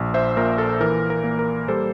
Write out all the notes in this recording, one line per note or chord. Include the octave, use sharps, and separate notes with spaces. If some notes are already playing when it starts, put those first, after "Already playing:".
Already playing: A#1
C5 E5
A#2 A#4
A4
E3 A#4
A#4
A#3
A#4
G3 A4 C5